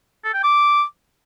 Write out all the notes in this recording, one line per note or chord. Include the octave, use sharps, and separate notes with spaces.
A4
G5
D6